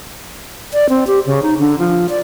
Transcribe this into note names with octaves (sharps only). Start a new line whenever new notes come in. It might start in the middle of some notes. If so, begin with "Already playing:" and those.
D5
C4
G4
C#3
D#4
D3
F3
D5